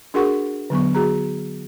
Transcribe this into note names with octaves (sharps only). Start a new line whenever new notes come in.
D4 F#4 G#4 A#4 F#5 C#6
D3 F#3 B3 C#6
F#4 G#4 A#5